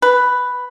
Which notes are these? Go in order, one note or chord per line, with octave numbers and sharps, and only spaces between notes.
B4